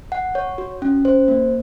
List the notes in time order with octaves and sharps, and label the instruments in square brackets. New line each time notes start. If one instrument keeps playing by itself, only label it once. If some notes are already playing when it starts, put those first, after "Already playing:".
[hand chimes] F#5
C#5
F#4
C#4
C5
A#3